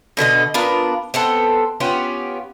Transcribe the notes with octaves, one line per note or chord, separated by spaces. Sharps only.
B2 D3 A#4 D#5
B3 D4 F4 A#4
B3 C4 A4
B3 C#4 F4 G4